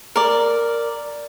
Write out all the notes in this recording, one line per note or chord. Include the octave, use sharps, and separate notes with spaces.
A#4 D5